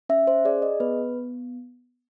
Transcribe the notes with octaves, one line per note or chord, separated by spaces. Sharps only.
C#4 E5
C5
G#4 D5
D#5
B3 B4